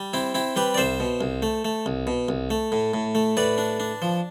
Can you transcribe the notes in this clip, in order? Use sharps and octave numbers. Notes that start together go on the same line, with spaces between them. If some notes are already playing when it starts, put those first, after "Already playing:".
Already playing: G3
C4 E4
C4 E4
G3 G4 B4
D5
C2 C5 E5
B2
C2
A3
A3
C2
B2
C2
A3
A2
A2
A3
A2 B4 D5
D4
D4
F3